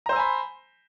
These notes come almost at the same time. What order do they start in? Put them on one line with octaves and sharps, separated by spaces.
A#5 C5 E6 G#5 B5